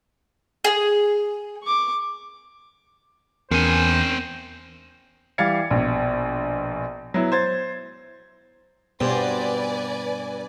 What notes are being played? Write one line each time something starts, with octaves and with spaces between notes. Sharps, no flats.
G#4
C#6 D6
E2 C4 C#4 A#4 C5 G#5 C#7
E3 G3 F5 G#6 A6 C#7
A#1 B2
F#3 B3 E4
C5 G#6 A6
G2 B2 B3 B4 C5 D5 G#5